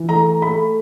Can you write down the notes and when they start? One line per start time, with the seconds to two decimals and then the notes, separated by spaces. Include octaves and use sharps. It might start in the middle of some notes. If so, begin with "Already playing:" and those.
Already playing: E3
0.09 A3 A#5
0.42 A3 B5